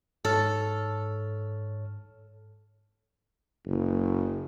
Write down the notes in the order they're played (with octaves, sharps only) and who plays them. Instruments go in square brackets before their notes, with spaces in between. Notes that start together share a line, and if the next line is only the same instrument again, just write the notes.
[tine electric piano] G#2 C#5 F6 [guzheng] A4
[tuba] F#1